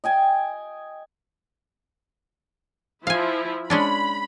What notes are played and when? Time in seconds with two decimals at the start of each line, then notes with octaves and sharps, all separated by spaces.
0.04 D#5 G5 G#5
3.07 F3 E4 F5 G#5
3.70 G#3 C#4 D4 B5